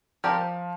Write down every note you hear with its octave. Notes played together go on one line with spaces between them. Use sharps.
F3 C4 G4 A#4 D5